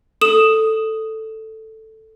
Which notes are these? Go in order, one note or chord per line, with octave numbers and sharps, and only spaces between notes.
A4 D#6 E7